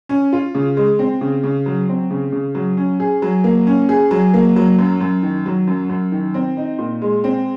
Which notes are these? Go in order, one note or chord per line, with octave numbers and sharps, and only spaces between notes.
C#4
F4
C#3
G#3
C4
C#3
C#3
F#3
C4
C#3
C#3
F#3
C#4
G#4
F#3
A#3
C#4
G#4
F#3
A#3
F#3
F#2
F#2
D#3
F#3
F#2
F#2
D#3
C4
D#4
A#2
G#3
C4